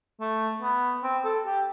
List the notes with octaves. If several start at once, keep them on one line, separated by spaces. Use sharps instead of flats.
A3
B3
C4
A4
G4